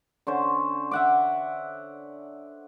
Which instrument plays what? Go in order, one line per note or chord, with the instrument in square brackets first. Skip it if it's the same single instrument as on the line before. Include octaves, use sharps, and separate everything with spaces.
[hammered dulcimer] D3 C#4 C5
E5 F#5 D6